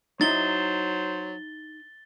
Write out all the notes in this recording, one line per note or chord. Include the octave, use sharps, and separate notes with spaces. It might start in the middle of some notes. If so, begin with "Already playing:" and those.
F#3 D#4 E4 C5 D#5 A6 G7